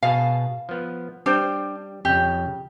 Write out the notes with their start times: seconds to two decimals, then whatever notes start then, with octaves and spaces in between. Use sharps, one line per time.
0.03 B2 G#4 F5 A5
0.69 F3 B3
1.26 G3 D4 C5 G5
2.05 F2 C#3 G4